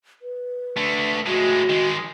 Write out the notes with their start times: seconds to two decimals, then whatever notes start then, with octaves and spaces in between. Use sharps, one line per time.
0.22 B4
0.77 D3 A3
1.26 A2 G#3 F#4
1.70 D#3 G#3